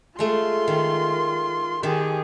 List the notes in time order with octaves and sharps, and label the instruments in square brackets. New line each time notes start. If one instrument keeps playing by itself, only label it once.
[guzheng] G#3 A3 [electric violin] F4 C6
[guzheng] D#3
[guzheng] D#3 A5 [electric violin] G4 G#4